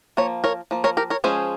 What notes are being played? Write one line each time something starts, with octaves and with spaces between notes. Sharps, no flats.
F3 A#3 C#5
A#4 C#5
F3 A#3
A#4 C#5
G4 A#4
A#4 C#5
F3 G#3 C#4 G#4 C5